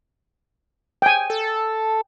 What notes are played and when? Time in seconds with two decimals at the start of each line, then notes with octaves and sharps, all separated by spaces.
1.02 G5 G#5
1.30 A4